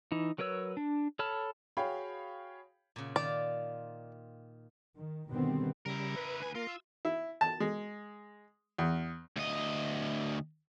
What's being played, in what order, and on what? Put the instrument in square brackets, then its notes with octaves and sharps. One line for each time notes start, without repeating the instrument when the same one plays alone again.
[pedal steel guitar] E3 D#4
F#3 A#4 B4 C#5 E6
D4
A4 C#5 A5 B5 F6
[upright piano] F#4 G#4 C#5 F5 G5 B5
[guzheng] A#2 C#3
[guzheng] D#3 F4 [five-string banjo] D5
[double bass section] D#3
B2 D3 D#3 G3 B3 C4
[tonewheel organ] C#3 G3 [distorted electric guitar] E4 A#4
[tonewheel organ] B4
[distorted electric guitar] D2 G#5
[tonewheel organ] A#3 A#4 [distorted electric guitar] F4
[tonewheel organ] E6
[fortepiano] E4
A5
G#3
E2
[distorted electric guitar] D2 D#5